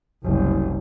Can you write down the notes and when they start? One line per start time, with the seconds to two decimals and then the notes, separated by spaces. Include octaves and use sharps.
0.24 F#1 C2